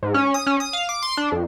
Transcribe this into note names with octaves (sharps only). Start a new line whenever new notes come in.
G#2
C#4
D#6
C#4
D#6
F5
D6
C6
D4
F2